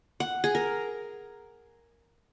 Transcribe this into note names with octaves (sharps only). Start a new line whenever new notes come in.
F#5
G#4
A#4